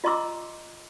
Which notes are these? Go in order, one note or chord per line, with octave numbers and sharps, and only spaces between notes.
F4 D#5 A#5 C6 D6 E6